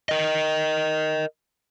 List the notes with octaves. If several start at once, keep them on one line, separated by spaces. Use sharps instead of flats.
A#4 D#5